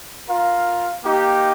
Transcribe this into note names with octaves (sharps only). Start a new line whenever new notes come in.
F4 A#4 F5
A#3 D#4 G4